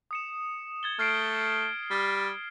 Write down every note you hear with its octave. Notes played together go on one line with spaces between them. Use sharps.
D#6 C#7 E7
G#6 A6 G7
A3 F6 C7 D7
G3